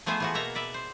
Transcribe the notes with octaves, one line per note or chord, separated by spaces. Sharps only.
F3 A3 B3 G#4 C5
E3 F3 F#4
B2 A#3 E5 A#5
B4 D5 E5
C5